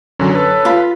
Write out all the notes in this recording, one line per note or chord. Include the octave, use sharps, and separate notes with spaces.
F#2 D3 F#3 C#4
A4 B4
F4 B5